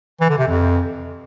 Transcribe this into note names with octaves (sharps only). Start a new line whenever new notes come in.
E3
D3
C3
F2